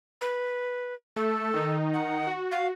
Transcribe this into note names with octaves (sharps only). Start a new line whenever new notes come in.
B4
A3 A4
D#3 D#4
F#5
F#4
F5